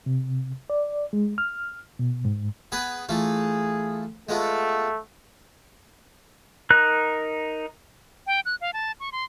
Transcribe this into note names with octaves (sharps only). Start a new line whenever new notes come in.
C3
D5
G#3
F6
B2
G#2
B3 G#4 B4
E3 A3 F4 G#4
G#3 A3 B3 F4
D#4 A#4 F#6
G5
F#6
F5
A5
C#6
C6